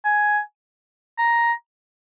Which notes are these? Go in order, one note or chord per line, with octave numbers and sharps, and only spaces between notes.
G#5
A#5